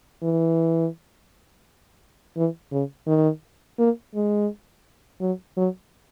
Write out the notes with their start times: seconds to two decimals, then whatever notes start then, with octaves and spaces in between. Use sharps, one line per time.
0.23 E3
2.36 E3
2.72 C#3
3.07 D#3
3.79 A#3
4.15 G#3
5.21 F#3
5.57 F#3